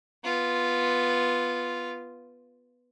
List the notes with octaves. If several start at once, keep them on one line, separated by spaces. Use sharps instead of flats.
B3 F4